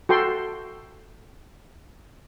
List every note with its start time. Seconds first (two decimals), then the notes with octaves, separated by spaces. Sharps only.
0.09 F#4 A4 G5 C6